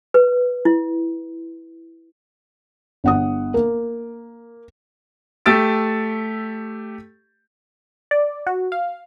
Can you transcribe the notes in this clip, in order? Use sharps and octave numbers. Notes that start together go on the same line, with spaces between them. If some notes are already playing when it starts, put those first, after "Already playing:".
B4
E4
G1 F#5 D#6
A#3
A3 G4 E6 A6 D7
D5
F#4
F5